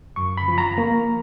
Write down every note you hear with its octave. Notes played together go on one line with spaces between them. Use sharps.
F#2 C#6
B5
F3
A#5
A#3